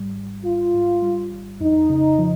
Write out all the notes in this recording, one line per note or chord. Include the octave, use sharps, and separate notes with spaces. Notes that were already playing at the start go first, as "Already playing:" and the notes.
Already playing: G#1 G#2 G3
G#1
G#1 F4
G#2
G3
G#1
F2 D#4
C#3
F3